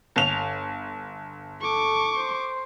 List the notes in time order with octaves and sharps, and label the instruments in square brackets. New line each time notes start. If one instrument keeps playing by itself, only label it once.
[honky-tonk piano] G1 F7
[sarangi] A4 [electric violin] C#6 D6
[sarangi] C5